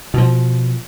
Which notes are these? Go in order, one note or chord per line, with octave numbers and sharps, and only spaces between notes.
B2 F3